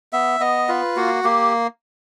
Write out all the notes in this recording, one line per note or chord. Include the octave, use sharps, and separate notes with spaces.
B3 E5
B3 D#5
F4 B4
A#3 F#4
A#3 G4